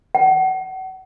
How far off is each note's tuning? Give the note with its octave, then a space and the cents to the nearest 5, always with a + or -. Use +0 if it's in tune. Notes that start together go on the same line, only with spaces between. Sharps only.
F#5 +35